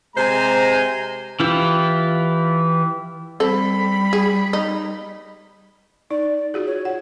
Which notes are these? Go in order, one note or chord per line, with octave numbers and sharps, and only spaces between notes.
C3 G#3 C5 G#5 A#5
E3 E4 F4 G4
G3 C4 A4 B5
G#4
D#4
D#4 D5
F4 F#4 G#4
C#5
F#5